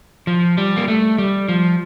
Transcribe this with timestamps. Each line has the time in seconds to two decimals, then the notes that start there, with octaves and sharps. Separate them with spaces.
0.27 F3
0.58 G3
0.76 A#3
0.88 A3
1.18 G3
1.48 F3